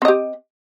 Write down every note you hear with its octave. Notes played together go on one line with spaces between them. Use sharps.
C4 G4 D#5